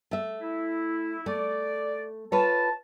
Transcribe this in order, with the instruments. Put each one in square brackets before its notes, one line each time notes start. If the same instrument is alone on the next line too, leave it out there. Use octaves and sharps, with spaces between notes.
[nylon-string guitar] A3 E5
[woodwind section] E4
[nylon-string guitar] A3 [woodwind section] D5
[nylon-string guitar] F4 B4 C#5 [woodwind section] A5